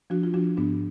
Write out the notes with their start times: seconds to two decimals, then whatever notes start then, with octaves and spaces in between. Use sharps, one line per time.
0.10 F3 D4 F#4
0.23 F4
0.34 F3 D4 F#4
0.57 G#2 B3 D4